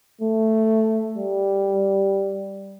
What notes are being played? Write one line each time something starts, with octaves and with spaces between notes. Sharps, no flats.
A3
G3